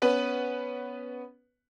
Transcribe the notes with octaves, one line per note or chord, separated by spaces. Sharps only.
B3 C#4 B4